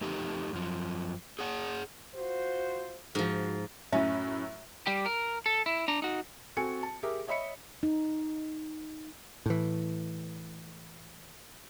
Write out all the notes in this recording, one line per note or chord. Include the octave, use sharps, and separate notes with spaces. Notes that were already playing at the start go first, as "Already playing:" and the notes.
F2 A3 D#4 G4
F#2 F3
G#4 C#5 F#5
F4 F#4 C5
G#2 F3 F#4
F#2 A2 C#4 E5
G3 G4
A#4
A4
E4
D4 A#5
D#4 F#4
C4 F#4 A4 G#5 C#7
A5
G4 G#4 A#4 E5
C#5 D#5 E5 B5 C#7
D#4
A2 E3